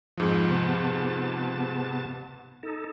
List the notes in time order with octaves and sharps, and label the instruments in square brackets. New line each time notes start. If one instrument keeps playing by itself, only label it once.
[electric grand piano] F2 G#2 F3
[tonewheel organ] C3 B3 A5
D#4 A4